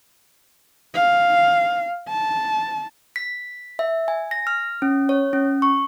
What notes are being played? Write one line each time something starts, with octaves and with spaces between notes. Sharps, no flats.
F5
A5
B6
E5
G#5
A#6
F6
C#4
C#5
C#4
C#6